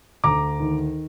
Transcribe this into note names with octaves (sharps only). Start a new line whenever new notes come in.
D2 A#5 D6
D#3